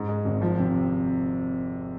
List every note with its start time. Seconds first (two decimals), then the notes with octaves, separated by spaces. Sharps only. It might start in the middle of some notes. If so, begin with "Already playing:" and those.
Already playing: G#2
0.08 G#3
0.25 G#1
0.42 F3
0.59 C3
0.75 C3